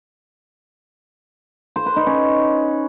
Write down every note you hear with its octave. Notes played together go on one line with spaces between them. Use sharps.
C5
B4
D#4
C#4